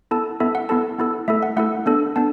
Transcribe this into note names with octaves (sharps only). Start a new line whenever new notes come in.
B3 E4 A4 A5
B3 E4 A4 E5
F#5
B3 E4 A4 A5
B3 E4 A4
A3 E4 A4 E5
F#5
A3 E4 A4 F#5
B3 D4 A4
B3 D4 A5